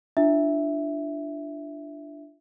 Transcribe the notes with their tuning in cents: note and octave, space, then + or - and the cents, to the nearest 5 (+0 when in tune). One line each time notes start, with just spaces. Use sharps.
D4 +10 F4 -20 E5 +0